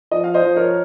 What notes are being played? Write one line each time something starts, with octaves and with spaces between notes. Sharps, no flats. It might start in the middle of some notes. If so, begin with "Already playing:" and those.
F3 D#5
F5
C5 D#5
F3
A#4 C#5